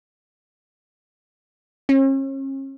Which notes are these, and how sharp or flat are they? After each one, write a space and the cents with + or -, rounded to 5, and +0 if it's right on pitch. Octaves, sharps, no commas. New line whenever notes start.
C#4 -40